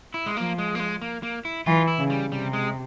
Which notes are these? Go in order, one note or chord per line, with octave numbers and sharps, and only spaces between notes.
E4
G#3
F3 A#3
G#3
A#3
G#3
A#3
A#3
E4
E3 F4
E4
C#3
G3
C3 G3
G#3